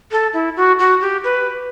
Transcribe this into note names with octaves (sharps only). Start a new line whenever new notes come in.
A4
E4
F#4
F#4
G4
B4